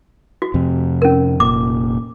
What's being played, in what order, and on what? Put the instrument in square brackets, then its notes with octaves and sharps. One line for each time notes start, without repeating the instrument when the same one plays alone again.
[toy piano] F#4
[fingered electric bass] F2 C3
[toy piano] C#4 A#4
[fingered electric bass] F1 A#2 [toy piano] D6